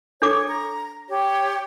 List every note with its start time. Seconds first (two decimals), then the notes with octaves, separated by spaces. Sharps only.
0.22 D4 A4 C#5 D6
0.48 A#5
1.09 G4 C#5